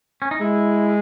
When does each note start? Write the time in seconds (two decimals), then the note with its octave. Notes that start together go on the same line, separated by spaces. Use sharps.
0.22 C#4
0.31 D#4
0.41 G#3 E4